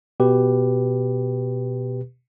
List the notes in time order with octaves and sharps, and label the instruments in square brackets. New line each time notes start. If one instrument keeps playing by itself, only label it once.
[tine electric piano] B2 G4 B4